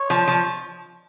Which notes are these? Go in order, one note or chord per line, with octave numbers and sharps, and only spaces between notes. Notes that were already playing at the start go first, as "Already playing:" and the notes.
Already playing: C#5
F3
F3